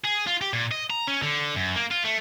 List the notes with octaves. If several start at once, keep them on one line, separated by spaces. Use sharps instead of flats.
G#4
F4
G4
A#2
D#5
A#5
C#4
D3
F#2
A#3
F4
A3